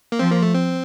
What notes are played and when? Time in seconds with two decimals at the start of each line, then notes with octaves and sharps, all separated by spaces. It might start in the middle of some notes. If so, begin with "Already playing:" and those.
0.12 A#3
0.19 F3 C4
0.31 A#3
0.42 A3
0.54 C4